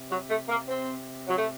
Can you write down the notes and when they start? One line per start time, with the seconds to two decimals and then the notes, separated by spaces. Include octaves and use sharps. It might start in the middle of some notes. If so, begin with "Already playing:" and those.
Already playing: C3
0.10 F#3
0.29 A3
0.48 A#3
0.68 C4
1.27 F#3
1.37 A3